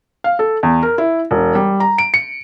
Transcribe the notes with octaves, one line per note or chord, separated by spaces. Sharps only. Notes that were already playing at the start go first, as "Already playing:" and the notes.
F5
A4
E2
A#4
E4
E1
G3
A#5
D7
C#7